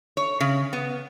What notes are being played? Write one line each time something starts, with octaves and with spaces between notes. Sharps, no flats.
C#5
C#3
B3